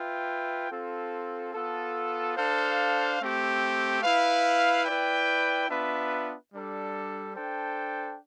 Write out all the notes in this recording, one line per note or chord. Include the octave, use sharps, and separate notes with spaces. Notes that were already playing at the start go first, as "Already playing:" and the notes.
Already playing: F4 B4 E5 G5
C4 F4 A4
B3 F4 A4
D4 A4 C5 F5
A3 C4 G4
E4 B4 F5
E4 B4 D5 G5
B3 D4 F4 B4 E5
G3 D4 A4
D4 A4 C5 G5